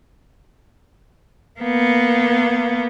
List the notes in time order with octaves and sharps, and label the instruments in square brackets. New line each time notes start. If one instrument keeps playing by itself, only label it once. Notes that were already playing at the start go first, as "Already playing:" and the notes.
[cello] A#3 B3